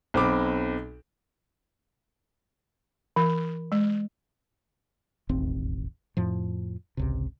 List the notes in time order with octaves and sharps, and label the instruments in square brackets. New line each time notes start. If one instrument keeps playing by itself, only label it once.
[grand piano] B1 C4 B5 D6
[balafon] E3
G#3
[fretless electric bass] E1 A1 D#2 C4
F2 A2 F3
G#1 C#2 C3